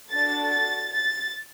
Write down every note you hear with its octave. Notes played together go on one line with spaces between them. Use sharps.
D4 F#4 A4 A6
A6
A6